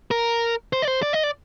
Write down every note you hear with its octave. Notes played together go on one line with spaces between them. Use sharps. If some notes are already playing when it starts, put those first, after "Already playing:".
A#4
C5
D5
C5
D5
D#5
D5